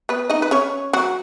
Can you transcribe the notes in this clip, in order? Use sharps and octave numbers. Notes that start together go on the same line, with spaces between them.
B3 B4
D#4 D#5
B4
C#4 C#5
F#3 F#4